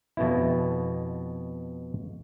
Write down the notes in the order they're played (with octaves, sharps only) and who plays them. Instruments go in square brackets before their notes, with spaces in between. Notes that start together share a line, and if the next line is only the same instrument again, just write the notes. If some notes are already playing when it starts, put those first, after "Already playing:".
[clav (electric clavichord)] F2 B2 B3 E4